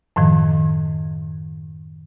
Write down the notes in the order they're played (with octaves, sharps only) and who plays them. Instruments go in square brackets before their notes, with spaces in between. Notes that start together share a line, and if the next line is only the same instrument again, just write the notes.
[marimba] F#2 A2 D#3 F3